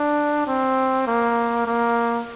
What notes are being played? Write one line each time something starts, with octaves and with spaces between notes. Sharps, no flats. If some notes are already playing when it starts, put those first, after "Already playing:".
Already playing: D4
C4
A#3
A#3